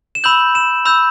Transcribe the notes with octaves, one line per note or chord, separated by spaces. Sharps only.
E7
B5 E6 G6 F#7
E7
B5 E6 G6